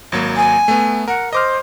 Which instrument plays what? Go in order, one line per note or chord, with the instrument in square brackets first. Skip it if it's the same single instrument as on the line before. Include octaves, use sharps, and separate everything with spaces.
[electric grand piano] G#1 F#3 A#3
[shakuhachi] G#5
[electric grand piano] A3 B3
[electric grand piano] A#4 [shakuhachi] F#5
[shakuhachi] C5 [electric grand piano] D#5 D6 F6